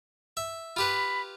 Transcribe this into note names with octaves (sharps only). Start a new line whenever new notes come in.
E5
F4 G4 B4 B5